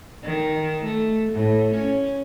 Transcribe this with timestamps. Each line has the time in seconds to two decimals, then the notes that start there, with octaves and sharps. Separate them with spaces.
0.23 D#3
0.84 A3
1.33 A2
1.75 C#4